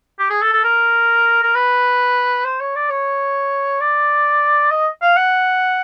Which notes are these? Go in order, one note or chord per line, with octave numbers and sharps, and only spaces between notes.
G4
G#4
A4
A4
A#4
A#4
B4
C5
C#5
D5
C#5
D5
D#5
F5
F#5